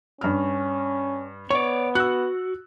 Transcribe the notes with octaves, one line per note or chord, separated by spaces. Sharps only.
G2 C#4 F6
B3 C#5 D5 C#6
F#4 E6 F#6